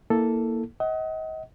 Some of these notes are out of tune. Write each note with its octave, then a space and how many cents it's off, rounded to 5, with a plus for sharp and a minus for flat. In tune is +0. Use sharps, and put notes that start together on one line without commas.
A#3 +0 E4 -15 A4 +0
D#5 +30 F#5 +25